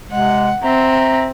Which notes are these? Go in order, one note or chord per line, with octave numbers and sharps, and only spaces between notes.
C3 G#3 F#5
C4 E5 A#5